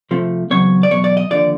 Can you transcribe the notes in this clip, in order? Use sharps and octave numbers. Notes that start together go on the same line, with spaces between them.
C3 F3 A3
E2 C#3 F#3 C4 C#5
D5
E2 B2 F#3 C#5
D5
D#5
D#2 D3 F3 D5